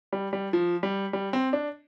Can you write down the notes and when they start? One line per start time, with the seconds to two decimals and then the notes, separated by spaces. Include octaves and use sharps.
0.13 G3
0.33 G3
0.53 F3
0.83 G3
1.13 G3
1.33 C4
1.53 D4